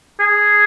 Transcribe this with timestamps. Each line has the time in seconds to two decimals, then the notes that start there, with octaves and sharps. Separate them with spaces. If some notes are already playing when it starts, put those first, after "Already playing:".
0.20 G#4